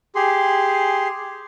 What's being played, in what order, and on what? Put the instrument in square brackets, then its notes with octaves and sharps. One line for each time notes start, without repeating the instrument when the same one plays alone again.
[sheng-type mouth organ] G4 G#4 C6